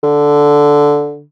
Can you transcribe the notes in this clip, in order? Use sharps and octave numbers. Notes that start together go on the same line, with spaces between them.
D3